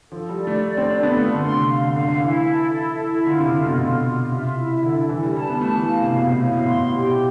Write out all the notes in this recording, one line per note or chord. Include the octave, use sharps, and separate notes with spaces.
F3 A4
G3
D5
A3
D5
C4
D4 A4
B3
A3 F4
D3
C6
C3
F5
D3
D3 F5
D3
E3 E4
A4
E4
E4
D3 F4
C3
C3 A4
B2
B2 F4
F4
C3 E5
E4
D3 A4
E3 E4
G3
G3 A5
B3
A3 A5
E3
F5
C3
B2 F5
A2
A2 F5
B2
B2 C6
A2
B2 G4